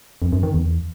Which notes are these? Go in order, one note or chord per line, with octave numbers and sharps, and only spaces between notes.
F2
F#2
D#3
E2